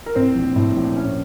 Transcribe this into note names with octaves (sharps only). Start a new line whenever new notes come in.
A#4
A2 C4 C5
A#1
A2
A#1
C#4